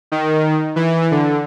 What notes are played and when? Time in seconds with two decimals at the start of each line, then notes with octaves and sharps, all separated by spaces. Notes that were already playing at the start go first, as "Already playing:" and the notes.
0.12 D#3
0.76 E3
1.11 D3